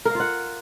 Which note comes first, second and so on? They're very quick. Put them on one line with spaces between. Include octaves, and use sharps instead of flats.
A#4 F5 F4 F#5